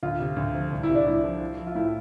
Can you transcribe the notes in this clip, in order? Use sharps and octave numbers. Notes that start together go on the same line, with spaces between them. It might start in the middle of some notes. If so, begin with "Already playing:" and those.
D2 F4
C3
D2
F3
C2
E4
C3
D4
C2 E4
F3
F4
F3
F4
A2 E4